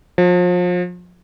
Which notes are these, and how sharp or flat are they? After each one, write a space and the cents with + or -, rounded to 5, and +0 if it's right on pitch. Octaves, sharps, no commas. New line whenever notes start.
F3 +35